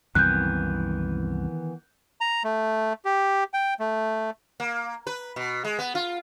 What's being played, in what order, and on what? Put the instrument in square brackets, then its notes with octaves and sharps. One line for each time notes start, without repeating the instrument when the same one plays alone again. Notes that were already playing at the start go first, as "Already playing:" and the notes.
[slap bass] C2 F#2 C3 [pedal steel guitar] D#3 E3 B3 [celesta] F#6 G6
[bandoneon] A#5
A3
G4
G5
A3
[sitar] A#3
B4
B2
G#3
B3
F4